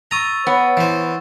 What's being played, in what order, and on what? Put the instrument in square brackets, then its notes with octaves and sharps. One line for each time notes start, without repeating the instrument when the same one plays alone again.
[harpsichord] A#5 D#6 [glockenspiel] C#6 E6 A6
[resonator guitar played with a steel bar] B3 [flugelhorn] C#5
[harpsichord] E3 C5